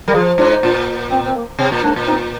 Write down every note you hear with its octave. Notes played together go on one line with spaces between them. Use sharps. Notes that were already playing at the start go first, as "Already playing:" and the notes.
G3 A#4
F3 F4 G#4
G#2 D4 F4
D#4
A#2 D4 F4
C4
C4
A#3
C3 C4
A#2
G#2 A#3 D4
A#2
C4 D#4